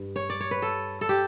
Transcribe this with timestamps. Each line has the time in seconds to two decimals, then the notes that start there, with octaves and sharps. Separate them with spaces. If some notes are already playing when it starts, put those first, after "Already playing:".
Already playing: G2
0.16 C#5
0.30 D5
0.41 C#5
0.51 B4
0.62 A4
1.01 A4
1.09 G4